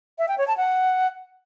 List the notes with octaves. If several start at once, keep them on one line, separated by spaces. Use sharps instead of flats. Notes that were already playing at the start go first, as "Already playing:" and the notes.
E5
G5
C#5
A5
F#5